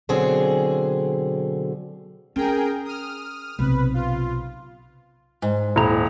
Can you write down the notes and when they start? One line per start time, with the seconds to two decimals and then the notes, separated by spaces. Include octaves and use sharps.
0.09 B2 D3 F#3 C4 G#4
2.36 C#4 G#4 A#4 G5
2.85 D#6 F6
3.59 B1 C3 B4
3.94 F4
5.42 G#2
5.76 D#1 E4 A#5